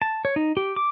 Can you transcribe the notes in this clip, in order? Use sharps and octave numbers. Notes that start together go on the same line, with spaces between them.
A5
C#5
D#4
G4
D6